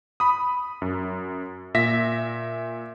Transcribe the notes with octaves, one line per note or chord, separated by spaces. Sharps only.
B5 D#6
F#2
A#2 E5 A#6 B6